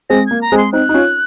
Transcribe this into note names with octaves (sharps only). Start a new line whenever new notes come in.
G#3 C4 A#6
A#3 G#6
A#5
G#3 C4
C6
C4 D#4 F#6
D#4
C#4 F4